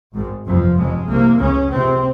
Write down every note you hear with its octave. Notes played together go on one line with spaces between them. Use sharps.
G#1 G#2
G1 F2 C3 F3
F1 F2 C#3 G#3
C2 C3 A#3
C#2 C#3 C#4
C#2 C3 C4